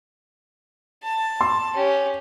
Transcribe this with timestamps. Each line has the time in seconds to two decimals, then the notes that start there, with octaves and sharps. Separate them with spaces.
1.03 A5
1.41 C6
1.74 C#4 G4